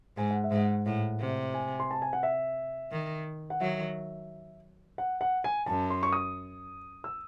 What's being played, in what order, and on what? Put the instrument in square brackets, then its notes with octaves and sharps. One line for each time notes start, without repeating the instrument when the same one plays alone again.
[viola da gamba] G#2 [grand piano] G#5
[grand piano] F#5
E5
[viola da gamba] G#2
[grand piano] F#5
[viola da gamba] A2 [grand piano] F#5
[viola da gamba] C3
[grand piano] G#5
C6
A5
G#5
F#5
E5
[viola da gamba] D#3
[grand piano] F#5
[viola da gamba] D#3 F#3 [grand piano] E5
[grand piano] F#5
F#5
G#5
[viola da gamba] F#2 [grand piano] A5
[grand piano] C6
C#6
D#6
E6